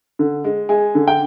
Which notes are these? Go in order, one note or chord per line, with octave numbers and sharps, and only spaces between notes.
D3
G#3
G#3 G#5
D3
G5